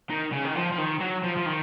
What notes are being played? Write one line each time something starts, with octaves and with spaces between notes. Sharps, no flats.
D#3
C#3
D#3
F3
F3
D#3
F#3
F3
F3
D#3